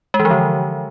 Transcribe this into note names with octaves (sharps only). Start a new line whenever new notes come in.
G#3
E3
F3
D3